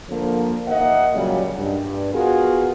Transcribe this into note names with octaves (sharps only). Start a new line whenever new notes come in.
D3 F3 A#3
D#2 A#3 D#5 E5 F#5
A#2 C#3 F#3 G3
G2
B3 F4 F#4 G#4 A#4